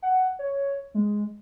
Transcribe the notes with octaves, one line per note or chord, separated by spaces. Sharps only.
F#5
C#5
G#3